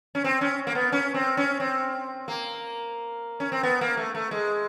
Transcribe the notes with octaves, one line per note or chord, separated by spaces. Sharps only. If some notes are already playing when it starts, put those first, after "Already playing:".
C#4
C4
C#4
A#3
B3
C#4
C4
C#4
C4
A#3
C#4
C4
B3
A#3
A3
A3
G#3